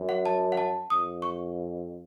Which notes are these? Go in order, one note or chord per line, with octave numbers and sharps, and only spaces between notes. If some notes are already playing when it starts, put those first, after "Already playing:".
Already playing: F#2
F#5
A5
F#5
A5
F2 D#6
C#6